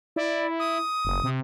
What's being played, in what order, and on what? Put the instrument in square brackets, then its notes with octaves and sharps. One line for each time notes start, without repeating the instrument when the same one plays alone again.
[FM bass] E4 [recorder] D5
[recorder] D#6
[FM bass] F#1
C3